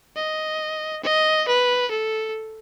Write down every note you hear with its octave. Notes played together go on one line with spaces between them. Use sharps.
D#5
D#5
B4
A4